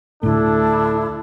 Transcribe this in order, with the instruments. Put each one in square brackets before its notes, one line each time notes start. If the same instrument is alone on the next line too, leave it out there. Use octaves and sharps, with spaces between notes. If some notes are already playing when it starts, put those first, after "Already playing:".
[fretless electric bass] D2 A2 [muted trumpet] D4 [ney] E4 [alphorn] A4